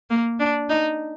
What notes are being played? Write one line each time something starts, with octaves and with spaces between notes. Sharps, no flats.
A#3
D4
D#4